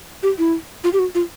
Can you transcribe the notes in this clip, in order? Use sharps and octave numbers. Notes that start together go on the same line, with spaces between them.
G4
E4
F4
G4
F#4
F4